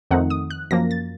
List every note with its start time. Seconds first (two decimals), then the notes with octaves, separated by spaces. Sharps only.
0.11 F2 D#3 A3 C4 D#4 F#5
0.30 D#6
0.50 F#6
0.71 F#2 F3 A#3 A#6
0.91 A6